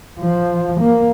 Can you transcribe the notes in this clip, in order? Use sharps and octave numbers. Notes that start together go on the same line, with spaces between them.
F3
A#3